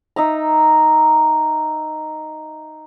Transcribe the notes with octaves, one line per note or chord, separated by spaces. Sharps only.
D#4 E5 A#5